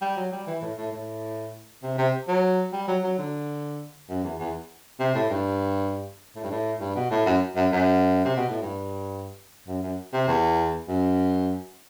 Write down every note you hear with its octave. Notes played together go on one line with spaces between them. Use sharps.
G3
F#3
G3
E3
A2
A2
A2
C3
C3
F#3
G3
F#3
F#3
D3
F#2
E2
E2
C3
A2
G2
A2
G2
A2
G2
B2
A2
F#2
F#2
F#2
C3
B2
A2
G2
F#2
F#2
C3
E2
F#2